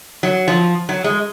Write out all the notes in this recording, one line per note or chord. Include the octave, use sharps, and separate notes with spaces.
F#3
F3
F#3
G#3